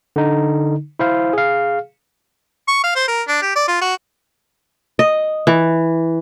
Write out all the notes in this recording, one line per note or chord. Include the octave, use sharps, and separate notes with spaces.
D3 D#4
E4 C5 F5
G#4 F5
C#6
F5
C5
A#4
D4
G4
D5
F4
F#4
D#5
E3